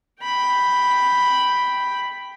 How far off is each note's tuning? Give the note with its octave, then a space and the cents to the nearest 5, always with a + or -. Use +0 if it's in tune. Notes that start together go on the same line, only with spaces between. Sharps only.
G5 +0 B5 +0